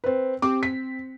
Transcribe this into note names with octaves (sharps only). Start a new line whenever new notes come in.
C4 B4
C4 G4 D6
B6